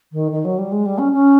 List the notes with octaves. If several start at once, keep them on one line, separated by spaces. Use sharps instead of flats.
D#3
D#3
F#3
G3
G#3
G3
C#4
C#4